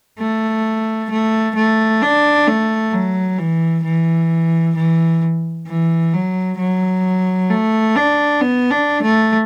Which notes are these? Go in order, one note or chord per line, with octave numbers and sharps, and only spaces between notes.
A3
A3
A3
D4
A3
F#3
E3
E3
E3
E3
F#3
F#3
A3
D4
B3
D4
A3